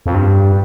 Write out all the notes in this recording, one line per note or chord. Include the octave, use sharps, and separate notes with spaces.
F2
G2